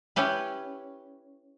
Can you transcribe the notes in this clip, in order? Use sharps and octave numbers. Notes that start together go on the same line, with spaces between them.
C#4 E4 G4 B4